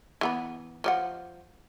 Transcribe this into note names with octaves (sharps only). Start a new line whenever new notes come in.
E3 B3 B5
F3 D5 F#5